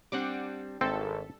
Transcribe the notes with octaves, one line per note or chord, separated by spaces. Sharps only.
G3 C4 D4 F#5 D6
G#1 C4 A4 E5